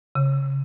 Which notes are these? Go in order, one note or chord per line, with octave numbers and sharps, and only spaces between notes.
C#3